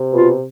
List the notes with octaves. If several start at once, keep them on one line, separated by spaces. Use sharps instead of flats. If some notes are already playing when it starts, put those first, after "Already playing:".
Already playing: C3
B2 F4